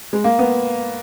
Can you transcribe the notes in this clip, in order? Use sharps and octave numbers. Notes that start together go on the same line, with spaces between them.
G#3
A#3
B3